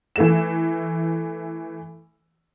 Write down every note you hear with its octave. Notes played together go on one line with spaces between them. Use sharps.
E3 A3 E7